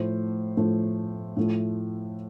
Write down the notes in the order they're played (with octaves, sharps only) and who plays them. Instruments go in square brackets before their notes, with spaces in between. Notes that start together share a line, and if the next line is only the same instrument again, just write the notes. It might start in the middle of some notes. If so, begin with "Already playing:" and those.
Already playing: [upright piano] A2 F3 A3 C5
A2 F3 A3
A2 F3 A3